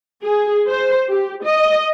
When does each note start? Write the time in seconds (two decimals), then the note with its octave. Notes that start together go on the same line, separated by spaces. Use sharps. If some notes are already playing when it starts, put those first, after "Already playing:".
0.24 G#4
0.68 C5
1.10 G4
1.44 D#5